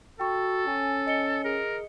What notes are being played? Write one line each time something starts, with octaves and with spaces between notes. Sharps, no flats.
F#4 A4 G5 C#6
C#4 G#5
D#5 C#7 G7
G#4 A#4